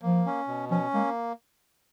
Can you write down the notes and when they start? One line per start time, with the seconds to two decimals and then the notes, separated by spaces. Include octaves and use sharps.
0.02 F3 A#3
0.26 C#4
0.48 B2
0.71 F3 C#4
0.94 G#3 A#3